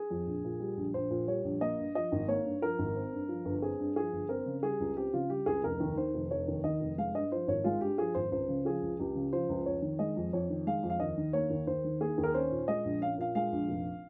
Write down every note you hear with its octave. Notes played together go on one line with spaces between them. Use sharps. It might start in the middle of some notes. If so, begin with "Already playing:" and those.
Already playing: G#4
F2
A#1
A#2
G3
A#1
A#1 C5
A#2
G3 C#5
A#1
A#3 D#5
G2
F3 D#5
G#1
A#3 C#5
G2
F3 A#4
G#1
C4
G2
F3
G1
C4 G#4
G2
F3 G#4
G1
C4 A#4
C#3
G3 G#4
C#2
C4 G4
C#3 F4
G3 G4
C#2 G#4
F1 A#4
D#2
D#3 C5
F1
F1 C#5
D#2
D#3 D#5
F1
G#3 F5
G2 D#5
F3 C5
G#1 C#5
G#3 F4
G2 G4
F3 G#4
G#1 C5
C#2 C5
C#3
F3 G#4
C#2
C#2 G4
C#3
F3 C5
C#2
F2 C#5
D#3
G#3 D#5
F2
F2 C#5
D#3
G#3 F5
F2
F5
D#2 D#5
D#3
A#3 C#5
D#2
D#2 C5
D#3
A#3 G#4
D#2
A#4
C#4 C5
A#2
G#3 D#5
A#1
C#4 F5
A#2 F5
G#3 F5
A#1
F1